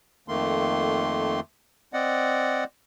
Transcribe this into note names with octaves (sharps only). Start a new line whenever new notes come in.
F2 D#3 A3 A#3 C6
C4 D5 D#5 F#5